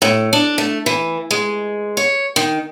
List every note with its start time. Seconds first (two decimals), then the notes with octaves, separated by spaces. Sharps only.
0.02 A2
0.33 D4
0.58 A3
0.86 E3
1.31 G#3
1.97 C#5
2.36 D#3